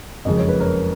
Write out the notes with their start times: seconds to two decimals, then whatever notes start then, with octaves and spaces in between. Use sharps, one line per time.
0.25 F#1 F2 C#3 G#3 D#5
0.37 C#5
0.49 B4
0.60 A#4 C#5